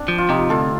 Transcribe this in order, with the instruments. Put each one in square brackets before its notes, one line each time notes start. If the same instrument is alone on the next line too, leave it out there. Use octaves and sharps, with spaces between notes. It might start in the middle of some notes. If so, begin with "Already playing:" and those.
Already playing: [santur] C4 D4
[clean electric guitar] F3
[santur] F4
[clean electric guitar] C3 [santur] D#4 G4
[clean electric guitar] D2 [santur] F4 A4